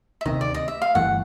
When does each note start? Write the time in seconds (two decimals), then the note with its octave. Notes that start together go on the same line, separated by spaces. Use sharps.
0.21 E5
0.26 D2 C3 D#3 D#5
0.41 D5
0.54 D#5
0.68 E5
0.82 F5
0.95 G1 G2 E3 A3 F#5